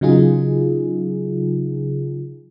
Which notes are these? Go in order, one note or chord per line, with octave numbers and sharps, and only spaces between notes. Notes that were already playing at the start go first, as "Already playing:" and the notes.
C#3 F#3 D#4 F4 G#4